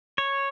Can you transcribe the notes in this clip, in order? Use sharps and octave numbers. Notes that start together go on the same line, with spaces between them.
C#5